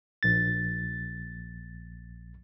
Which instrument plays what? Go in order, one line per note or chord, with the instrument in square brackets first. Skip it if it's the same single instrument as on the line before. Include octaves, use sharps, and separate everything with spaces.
[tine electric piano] A#1 A6